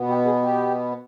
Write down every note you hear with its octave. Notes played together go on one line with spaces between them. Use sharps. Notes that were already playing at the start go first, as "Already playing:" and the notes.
Already playing: B2 B3
G4
G#4
G4